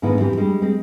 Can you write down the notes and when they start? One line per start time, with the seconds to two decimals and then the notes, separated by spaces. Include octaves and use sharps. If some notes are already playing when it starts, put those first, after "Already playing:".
0.02 G#2 D3 D#3 B3 E4
0.19 E3 C4 G4
0.37 G3 G#3 D4
0.62 G#3 C4